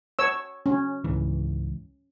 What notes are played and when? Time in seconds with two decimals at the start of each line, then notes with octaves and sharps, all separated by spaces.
0.19 C#5 E6
0.66 C#4
1.04 C#2 G#2 E3